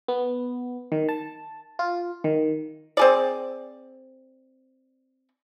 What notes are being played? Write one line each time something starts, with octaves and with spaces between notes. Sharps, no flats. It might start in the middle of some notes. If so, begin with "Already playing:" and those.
B3
D#3
A5
F4
D#3
C4 G#4 D5